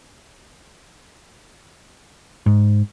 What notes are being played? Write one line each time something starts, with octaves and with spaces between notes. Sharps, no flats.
G#2